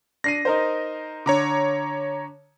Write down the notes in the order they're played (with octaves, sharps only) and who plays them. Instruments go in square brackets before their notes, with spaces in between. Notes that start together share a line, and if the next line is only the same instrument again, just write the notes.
[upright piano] D4 C7 D#7 [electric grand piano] A#6
[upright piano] D#4 A#4 C5
[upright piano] D3 [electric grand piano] C#5 A#5 D6